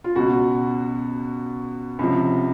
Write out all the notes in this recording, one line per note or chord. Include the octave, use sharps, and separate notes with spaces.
F4
C#2 B2 F#4
C#2 C3 F3